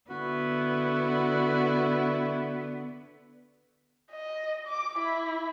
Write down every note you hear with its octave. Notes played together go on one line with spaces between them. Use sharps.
D3 B3 E4 F#4
D#5
D6
E4